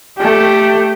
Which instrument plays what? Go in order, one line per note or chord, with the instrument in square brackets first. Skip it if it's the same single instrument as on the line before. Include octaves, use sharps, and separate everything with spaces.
[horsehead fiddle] A3 G4